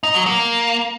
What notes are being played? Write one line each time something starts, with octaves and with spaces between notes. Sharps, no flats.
D#4
F#3
A#3